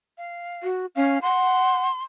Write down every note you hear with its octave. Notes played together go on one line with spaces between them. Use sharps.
F5
F#4
C#4 F5
F#5 C6